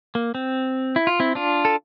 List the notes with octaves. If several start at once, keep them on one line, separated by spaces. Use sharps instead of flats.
A#3
C4
E4
F4
C4 E4
D4 F4
A4